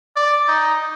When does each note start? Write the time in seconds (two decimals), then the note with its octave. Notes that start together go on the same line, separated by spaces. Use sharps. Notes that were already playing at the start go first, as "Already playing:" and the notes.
0.16 D5
0.48 D#4